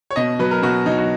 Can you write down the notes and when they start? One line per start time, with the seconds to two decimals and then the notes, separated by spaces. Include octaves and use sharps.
0.11 C#5
0.16 B2 D#5
0.39 F#3 B4
0.51 A#4
0.63 B2 F#4
0.86 F#3 D#4
0.98 F#4